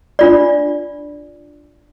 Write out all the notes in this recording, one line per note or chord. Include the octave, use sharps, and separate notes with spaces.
D4 F4 D5